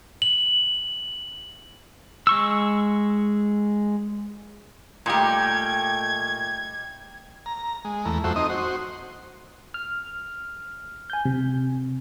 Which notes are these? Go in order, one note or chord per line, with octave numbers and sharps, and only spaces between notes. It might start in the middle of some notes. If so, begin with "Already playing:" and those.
F#7
G#3 C#6 E6
A#2 G3 A3 D#4 G4 G#6
A#5
G#3
E2 A3 A#5
F2 A3 F#4 C5 E5
C4 D#4 D#5
F#4 C5
F6
G#5 G6
C3